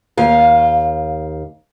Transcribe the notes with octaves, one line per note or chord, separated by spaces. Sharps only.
D#2 F5